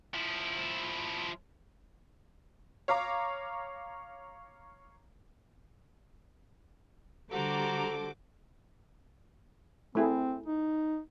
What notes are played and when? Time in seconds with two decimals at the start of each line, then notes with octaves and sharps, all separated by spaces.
0.14 F3 E4
2.88 C#5 F5 A#5 D6
7.31 D3 G3 F#4 A4 C5 A#5 D6
9.95 A3 C4 E4 G#4
10.46 D#4